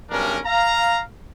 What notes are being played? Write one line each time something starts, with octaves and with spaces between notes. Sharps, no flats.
B1 G2 C#4 D4 A#4
F5 A#5